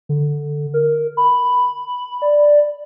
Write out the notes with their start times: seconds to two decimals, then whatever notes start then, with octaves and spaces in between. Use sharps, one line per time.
0.09 D3
0.74 A#4
1.17 B5
2.22 D5